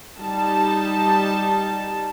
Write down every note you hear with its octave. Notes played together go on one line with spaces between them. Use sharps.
G3 D#4 A5